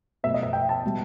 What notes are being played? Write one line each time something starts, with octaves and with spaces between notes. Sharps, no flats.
B1 B2 A3 E5
D#5
E5
G5
A5
B2 G3